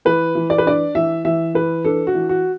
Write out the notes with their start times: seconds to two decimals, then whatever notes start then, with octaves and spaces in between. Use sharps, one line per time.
0.05 E3 B4
0.35 E3
0.50 D5
0.58 B4
0.66 D4 D5
0.95 E3 E5
1.25 E3 E5
1.55 E3 B4
1.85 D4 A4
2.07 F#4
2.14 E3
2.29 F#4